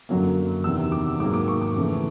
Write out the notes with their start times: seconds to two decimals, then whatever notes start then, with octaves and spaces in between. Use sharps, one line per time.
0.09 F#2 D3 F#3 A#3
0.64 E2 C3 D#3 E6
0.92 D6
1.20 G#2 D#3 F#3 A#3 D6
1.34 D6
1.48 C#6
1.61 D6
1.76 F2 C#3 E3 A3